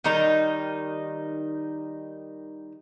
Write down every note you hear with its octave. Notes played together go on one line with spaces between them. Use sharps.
D#3 G3 D#4 A#5